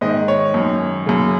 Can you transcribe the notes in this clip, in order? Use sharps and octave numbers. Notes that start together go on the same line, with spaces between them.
G#2 D#3 D#5
C#5
F#2 D#3
F#2 C#3